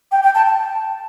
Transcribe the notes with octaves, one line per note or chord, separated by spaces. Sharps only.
G5
G5
A5
A5